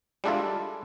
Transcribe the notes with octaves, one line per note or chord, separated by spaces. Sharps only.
G3 G#3 D4 E4 F4 A4